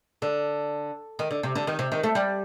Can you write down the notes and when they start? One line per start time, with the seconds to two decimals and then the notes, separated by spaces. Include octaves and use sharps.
0.22 D3
1.19 D#3
1.31 D3
1.43 C3
1.55 D3
1.67 D#3
1.79 C3
1.92 D#3
2.03 A3
2.15 G3